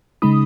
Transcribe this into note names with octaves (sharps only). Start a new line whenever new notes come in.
C#3 G#3 D#4 B5 D#6